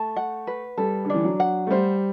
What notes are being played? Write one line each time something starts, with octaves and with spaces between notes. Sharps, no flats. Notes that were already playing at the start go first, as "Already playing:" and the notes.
Already playing: A3 A5
F#5
B4
G3 A4
D3
E3 D4
F#3
F#5
A3
G3 C5